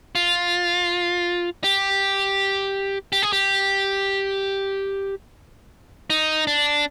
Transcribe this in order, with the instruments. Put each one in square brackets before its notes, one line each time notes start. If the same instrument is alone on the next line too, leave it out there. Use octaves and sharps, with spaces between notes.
[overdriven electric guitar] F4
G4
G4
G#4
G4
D#4
D4